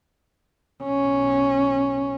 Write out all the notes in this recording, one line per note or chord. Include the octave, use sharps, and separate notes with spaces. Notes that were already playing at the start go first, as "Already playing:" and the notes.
B1 C#4